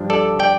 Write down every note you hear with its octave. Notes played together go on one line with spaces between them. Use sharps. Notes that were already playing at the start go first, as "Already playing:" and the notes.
Already playing: G2 F3 D4
A4 D5
D5 G5